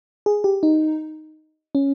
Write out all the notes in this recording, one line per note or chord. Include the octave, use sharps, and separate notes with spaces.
G#4
G4
D#4
C#4